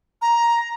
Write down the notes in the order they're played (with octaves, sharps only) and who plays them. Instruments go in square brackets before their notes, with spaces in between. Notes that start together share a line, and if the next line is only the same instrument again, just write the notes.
[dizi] A#5